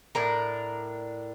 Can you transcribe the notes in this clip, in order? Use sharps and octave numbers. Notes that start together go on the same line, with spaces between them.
A2 D4 A#4 A#5